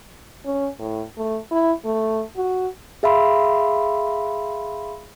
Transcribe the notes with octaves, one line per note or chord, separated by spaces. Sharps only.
C#4
A2
A3
E4
A3
F#4
G#4 E5 F5 B5 C6